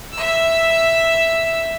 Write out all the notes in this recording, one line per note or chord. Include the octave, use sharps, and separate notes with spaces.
E5 E6